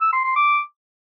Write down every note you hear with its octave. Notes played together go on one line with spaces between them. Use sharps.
E6
C6
C6
D6